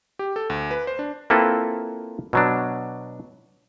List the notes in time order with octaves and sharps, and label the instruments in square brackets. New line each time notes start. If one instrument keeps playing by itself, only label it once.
[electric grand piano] G4
A4
D2
B4
C5
D4
[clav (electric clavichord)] A#3 C4 E4 F4 A4 B4
B2 F#3 D4